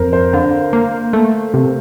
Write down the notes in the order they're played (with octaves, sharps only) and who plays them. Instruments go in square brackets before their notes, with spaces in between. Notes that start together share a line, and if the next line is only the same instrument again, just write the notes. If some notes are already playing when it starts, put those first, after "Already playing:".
Already playing: [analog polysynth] F2 [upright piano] A#4 C5
[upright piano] C5
[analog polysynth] D3 [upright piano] F5
[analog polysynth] A#3
A3
C3